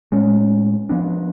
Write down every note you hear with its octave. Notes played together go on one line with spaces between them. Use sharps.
A2 G#3 C#4
F3 B3 D4